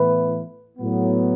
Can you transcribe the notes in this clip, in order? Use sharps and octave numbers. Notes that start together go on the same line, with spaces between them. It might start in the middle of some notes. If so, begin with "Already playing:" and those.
Already playing: A2 E3 B3 E4 B4
A2 F#3 B3